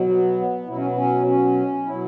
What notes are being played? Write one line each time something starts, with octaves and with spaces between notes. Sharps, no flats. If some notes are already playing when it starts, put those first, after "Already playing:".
Already playing: B2 F#3
B3
B2 F#3 E4
C#4
B3
C#4
C#4
B2 F#3 E4